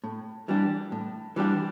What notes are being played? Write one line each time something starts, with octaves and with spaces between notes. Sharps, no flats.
A2
E3 G3 D4 G4
A2
E3 G3 D4 G4